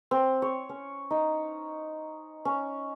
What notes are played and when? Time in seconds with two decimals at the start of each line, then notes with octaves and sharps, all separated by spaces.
0.11 C4
0.42 C#5
0.69 C#4
1.10 D#4
2.45 C#4